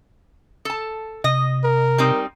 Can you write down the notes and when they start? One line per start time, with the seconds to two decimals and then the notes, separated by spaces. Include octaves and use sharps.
0.65 A4 A5
1.24 C3 D#5
1.64 A#4
1.98 G3 C4 D#4